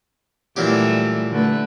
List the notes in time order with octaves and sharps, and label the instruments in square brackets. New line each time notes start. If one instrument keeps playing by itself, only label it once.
[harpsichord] A#2 F#3 G4 [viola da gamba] E3 G3 A3
[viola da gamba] D3 A3 B4